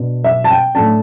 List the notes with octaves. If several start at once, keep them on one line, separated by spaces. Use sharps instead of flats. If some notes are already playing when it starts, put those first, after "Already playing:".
Already playing: B2 B3 D4
E5
A5
G5
A2 A3 D4 A5